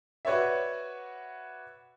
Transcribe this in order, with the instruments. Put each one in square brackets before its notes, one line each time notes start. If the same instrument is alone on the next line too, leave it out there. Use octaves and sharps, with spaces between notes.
[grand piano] F#4 B4 C#5 D5 E5